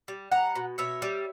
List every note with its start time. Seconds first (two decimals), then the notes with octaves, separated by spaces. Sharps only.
0.08 G3
0.32 G3 F#5 A#5
0.55 B2
0.78 B2 C#5 E5
1.02 G3